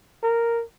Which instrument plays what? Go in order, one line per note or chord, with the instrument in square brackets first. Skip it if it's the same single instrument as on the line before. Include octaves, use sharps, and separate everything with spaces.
[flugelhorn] A#4